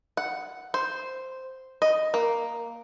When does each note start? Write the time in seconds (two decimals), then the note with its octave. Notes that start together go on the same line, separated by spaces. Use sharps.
0.17 F#5
0.74 C5
1.82 D#5
2.14 A#3